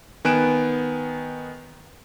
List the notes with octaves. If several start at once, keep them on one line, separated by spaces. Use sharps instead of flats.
D#3 B3 G#5 F#6 D7 E7